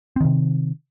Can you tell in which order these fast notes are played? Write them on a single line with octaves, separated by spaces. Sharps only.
C4 D#3 C3